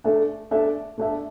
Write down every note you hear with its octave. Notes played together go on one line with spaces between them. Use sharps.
A3 D4 A4 E5
A3 D4 A4 E5
A3 D4 A4 E5